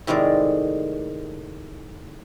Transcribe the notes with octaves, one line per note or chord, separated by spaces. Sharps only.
A2 C3 D#3 G#3 D5